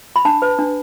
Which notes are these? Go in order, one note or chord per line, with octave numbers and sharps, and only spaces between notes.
B5
D4 A5
B4
D4